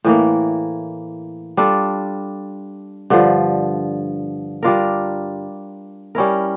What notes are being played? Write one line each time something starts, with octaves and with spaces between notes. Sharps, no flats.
A2 E3 A#3
G3 D4 F4 A4
G2 D3 F3
G3 D4 F4 A#4
G3 C#4 E4 A#4